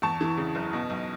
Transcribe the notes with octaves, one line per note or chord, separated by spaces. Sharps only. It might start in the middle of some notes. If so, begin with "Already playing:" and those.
E2 A5 C#6
E3
C#3
F#1
B2
B1